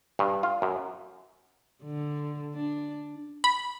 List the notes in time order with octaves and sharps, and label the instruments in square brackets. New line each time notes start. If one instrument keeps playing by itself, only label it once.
[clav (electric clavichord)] G2
F4
F#2
[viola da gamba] D3
D4
[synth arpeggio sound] B5